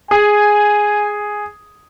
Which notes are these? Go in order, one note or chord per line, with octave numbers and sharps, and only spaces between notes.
G#4 G#5